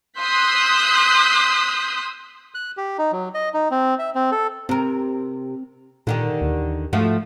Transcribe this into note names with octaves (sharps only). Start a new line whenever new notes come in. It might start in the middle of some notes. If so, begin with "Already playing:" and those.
C6 D#6 E6 F#6 G6 B6
F#6
G4
D#4
F#3
D#5
D#4
C4
E5
C4
A4
C3 C4 A#4
A#2 D3 D#3 G4
D#2
G#2 F3 A3 F#4